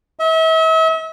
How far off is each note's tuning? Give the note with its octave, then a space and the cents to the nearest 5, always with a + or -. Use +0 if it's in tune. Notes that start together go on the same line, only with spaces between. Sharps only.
E5 -40